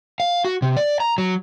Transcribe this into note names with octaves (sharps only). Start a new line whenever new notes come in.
F5
F#4
C3
D5
A#5
F#3